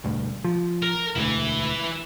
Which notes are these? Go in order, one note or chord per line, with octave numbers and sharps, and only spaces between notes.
E1 D2 G2
F3
A#4
E1 D2 E3 E4